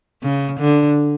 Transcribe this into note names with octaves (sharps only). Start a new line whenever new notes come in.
C#3
D3